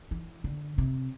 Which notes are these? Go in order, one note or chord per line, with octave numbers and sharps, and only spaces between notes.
E3
D3
C3